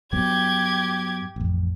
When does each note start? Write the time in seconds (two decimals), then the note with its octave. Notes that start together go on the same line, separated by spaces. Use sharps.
0.13 G2 F#3 B3 G4 G#6
1.36 A1 F2